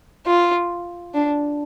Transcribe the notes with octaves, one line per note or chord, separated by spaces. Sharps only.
F4
D4